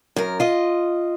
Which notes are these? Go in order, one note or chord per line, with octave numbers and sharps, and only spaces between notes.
F#2 A#4
F4 D#5